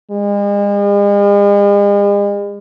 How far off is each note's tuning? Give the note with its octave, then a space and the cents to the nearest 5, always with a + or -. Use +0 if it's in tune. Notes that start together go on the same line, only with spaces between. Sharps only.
G#3 -45